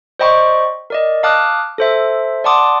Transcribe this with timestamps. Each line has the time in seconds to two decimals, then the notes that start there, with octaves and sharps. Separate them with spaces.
0.19 C5 D5 D#5 G5 B5 C#6
0.90 A#4 D5 D#5
1.23 F5 A5 D6 D#6 F6 F#6
1.78 A4 C5 E5
2.44 D5 F#5 A5 C6 D6 D#6